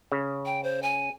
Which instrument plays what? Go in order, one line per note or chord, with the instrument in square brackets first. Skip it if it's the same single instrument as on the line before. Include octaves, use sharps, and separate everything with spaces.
[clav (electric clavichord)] C#3
[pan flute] G5
C5
G#5